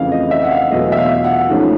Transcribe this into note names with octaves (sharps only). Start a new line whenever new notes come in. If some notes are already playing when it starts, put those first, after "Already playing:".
Already playing: F2 C#3 E3 A3 F5
D#5
E5
F#5
F5
E2 B2 F#3 A3 D#5
E5
F5
F#5
G#2 F3 A3 C#4